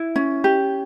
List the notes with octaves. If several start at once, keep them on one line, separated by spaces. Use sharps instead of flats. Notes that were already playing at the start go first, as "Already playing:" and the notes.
Already playing: E4
C#4
G4